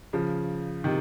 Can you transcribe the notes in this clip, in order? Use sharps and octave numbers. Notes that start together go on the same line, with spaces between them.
C#3 F3
C3 D#3